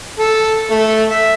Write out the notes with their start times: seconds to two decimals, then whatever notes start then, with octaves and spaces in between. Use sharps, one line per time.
0.19 A4
0.71 A3
1.11 E5